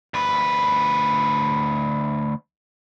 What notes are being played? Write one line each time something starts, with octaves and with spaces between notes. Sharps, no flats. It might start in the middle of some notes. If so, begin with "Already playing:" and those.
D2 B4